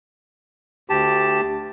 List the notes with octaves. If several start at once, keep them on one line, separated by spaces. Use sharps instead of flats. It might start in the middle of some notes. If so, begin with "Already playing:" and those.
D2 G4 A5